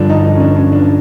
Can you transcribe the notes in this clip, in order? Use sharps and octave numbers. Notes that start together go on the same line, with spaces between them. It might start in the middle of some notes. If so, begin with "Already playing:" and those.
Already playing: G2 D3 F3 D4
D#4
D#4
C#4
D4
C#4
D4